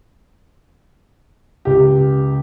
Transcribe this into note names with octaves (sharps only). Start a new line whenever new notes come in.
C#2 G4